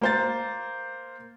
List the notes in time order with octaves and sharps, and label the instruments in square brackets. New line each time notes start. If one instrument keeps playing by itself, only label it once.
[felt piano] A#3 C5 A6